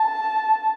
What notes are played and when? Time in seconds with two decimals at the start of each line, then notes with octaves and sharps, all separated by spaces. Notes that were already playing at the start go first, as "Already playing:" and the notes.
Already playing: A5